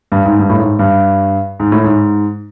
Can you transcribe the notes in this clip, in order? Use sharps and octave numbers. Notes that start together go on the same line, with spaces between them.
G2
G#2
G2
A2
G#2
G2
G#2
A2
G#2